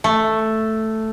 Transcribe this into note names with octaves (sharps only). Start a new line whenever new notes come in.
A3